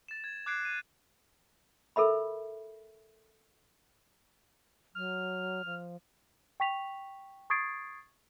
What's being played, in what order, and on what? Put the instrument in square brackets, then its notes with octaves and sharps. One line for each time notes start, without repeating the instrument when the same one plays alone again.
[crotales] A6 E7
G#6
D6 F#6 G#6 C7 D7 E7
D#7
[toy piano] A4 A#4 E5 B5
[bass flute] F#3 [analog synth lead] F6
[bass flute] F3
[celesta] G5 C#6 B6 F7
C#6 D#6 G#6 A6 C7 D7